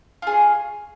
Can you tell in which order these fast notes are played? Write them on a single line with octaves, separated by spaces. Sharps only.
F4 G#4 C#5